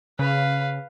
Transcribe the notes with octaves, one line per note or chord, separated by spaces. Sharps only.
C#3 B4 F5